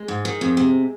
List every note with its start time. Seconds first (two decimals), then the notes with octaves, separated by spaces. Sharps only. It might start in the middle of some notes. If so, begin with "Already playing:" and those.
Already playing: G#3
0.08 G#2
0.25 D#3
0.41 F2
0.57 C3